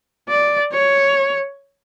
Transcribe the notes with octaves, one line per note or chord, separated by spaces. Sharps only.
D5
C#5